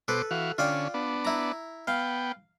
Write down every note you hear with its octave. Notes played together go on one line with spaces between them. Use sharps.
B2 A4 B4 C5 D6
E3 F#4 F5
D3 C#4 F4 D5 G5
B3 D4
E4 A#5
B3 F5 G5